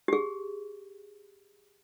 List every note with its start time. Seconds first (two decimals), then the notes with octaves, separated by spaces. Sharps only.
0.08 G4 G#4